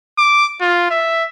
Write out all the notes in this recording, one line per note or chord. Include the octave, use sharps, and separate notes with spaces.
D6
F4
E5